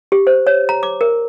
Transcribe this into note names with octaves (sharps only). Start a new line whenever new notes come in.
G4
C5
C#5
A#5
D6
A#4